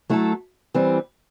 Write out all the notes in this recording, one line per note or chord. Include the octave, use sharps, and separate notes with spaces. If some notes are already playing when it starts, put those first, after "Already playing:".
F#3 A3 E4 A4
E3 G3 C4